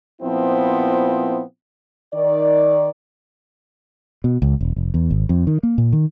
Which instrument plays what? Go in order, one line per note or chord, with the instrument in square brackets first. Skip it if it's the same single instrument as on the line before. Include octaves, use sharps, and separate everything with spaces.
[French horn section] A#2 F3 B3 C4 E4
D#3 D5
[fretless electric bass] B2
C#2
E1
F1
E2
G#1
F2
D#3
A#3
A#2
D#3